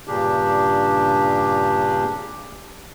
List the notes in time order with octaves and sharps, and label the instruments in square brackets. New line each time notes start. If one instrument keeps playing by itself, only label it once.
[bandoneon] G2 A#2 C#3 D4 G4